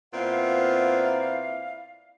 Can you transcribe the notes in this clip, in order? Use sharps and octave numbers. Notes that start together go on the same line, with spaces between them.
A#2 B3 C4 E4 D5 F5